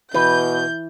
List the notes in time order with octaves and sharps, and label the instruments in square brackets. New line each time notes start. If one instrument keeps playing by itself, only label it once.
[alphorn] B2 [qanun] E3 [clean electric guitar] B4 [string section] G6